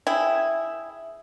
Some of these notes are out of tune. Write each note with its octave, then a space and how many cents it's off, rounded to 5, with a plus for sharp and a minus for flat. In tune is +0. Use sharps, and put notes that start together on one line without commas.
E4 +0 G#4 +0 G5 -10